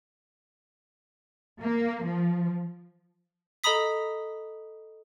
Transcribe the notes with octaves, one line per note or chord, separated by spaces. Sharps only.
A#3
F3
A4 D#5 A#5 B5 D#6 B6